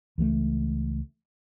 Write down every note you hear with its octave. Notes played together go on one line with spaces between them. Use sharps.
C#2 E3 F3 A3